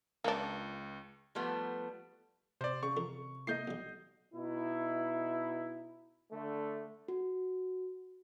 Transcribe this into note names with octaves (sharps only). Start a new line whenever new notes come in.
C#2 A#3 D4
F3 G3 A3 B3
C3 C5 D5
C#3 C#6
F2 A4 A#4
A3 A#3 E4 D#5 G6 C7
B1 G3
B2 D#4 E4
D3 A3
F#4